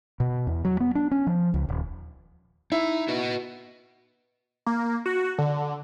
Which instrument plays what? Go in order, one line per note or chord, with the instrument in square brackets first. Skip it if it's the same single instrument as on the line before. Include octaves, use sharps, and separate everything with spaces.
[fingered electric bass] B2
E2
F#3
B3
D4
C#4
F3
C#2
D#1
[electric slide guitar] D#4 [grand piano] E4
[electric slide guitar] F#4 B4 D#5
[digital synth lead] A#3
F#4
D3